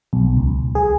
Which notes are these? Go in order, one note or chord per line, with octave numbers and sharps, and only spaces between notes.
B1
C#2
G#4